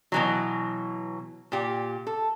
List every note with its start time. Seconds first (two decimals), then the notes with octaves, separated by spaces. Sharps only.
0.12 B2 E3 F#3
1.52 A#2 G4
2.07 A4